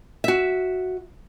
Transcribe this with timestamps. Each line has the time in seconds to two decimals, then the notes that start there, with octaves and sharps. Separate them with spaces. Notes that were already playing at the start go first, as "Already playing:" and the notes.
0.24 F#4 E5